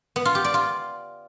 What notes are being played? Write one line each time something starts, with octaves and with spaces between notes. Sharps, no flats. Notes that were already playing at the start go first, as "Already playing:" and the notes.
B3
F4
G4
D5
F4